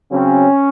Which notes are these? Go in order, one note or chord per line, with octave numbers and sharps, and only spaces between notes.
C#3 F#3 C4 C#4